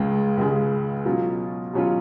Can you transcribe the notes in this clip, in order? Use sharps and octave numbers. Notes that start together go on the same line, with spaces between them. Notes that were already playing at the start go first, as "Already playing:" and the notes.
Already playing: C#2 C#3 G#3
C#2 C#3 G#3
B2 F#3 C#4 F4
B2 F#3 C#4 F4